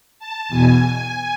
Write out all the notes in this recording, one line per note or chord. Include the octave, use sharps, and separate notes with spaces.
A5
E2 B2 G#5